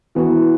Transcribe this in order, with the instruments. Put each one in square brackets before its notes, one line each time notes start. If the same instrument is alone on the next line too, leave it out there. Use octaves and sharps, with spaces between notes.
[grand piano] E3 B3 F#4